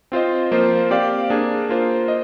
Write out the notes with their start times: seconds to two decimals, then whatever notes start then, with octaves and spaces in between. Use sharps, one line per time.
0.12 C4 F4 C5 D#5
0.51 F3 A#3 F4 C5
0.90 C4 G4 D5 F5
1.30 A#3 D4 G#4
1.69 A#3 F4 C5
2.08 D#5